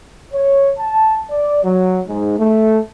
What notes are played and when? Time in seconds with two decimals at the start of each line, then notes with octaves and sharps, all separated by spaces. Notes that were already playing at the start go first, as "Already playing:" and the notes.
0.33 C#5
0.79 A5
1.29 D5
1.64 F#3
2.07 G#2
2.39 A3